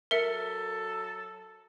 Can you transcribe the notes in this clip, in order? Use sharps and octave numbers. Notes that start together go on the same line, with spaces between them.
F#3 A4 A#4 E5 C#7